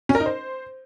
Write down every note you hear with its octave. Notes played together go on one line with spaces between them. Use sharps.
C#4
A#4
D#4
C5